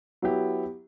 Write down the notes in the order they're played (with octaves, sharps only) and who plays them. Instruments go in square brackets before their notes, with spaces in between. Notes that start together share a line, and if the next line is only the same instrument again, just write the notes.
[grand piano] F#3 B3 E4 G4